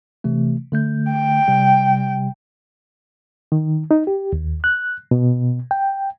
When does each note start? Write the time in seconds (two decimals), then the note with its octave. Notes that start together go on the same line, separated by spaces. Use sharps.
0.24 C3 E3 A3
0.72 D3 A3 G6
1.11 G5
1.48 C3 G3
3.52 D#3
3.91 D#4
4.07 G4
4.33 D#2
4.64 F#6
5.11 B2
5.71 G5